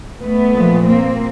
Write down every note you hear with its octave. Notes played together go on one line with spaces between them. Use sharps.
A3 B3
A#2 F3
A#3 C4